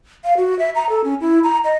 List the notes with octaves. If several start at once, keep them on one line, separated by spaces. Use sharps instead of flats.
F5
F#4
E5
A#5
A4
C#4
E4
A#5
D#5